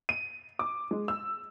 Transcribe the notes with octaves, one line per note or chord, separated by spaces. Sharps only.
D#7
D6
G#3
E6